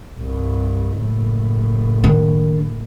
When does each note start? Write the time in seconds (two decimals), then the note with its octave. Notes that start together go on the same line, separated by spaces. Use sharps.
0.19 C2 G2
0.99 F#1 A2
2.04 D#3 D4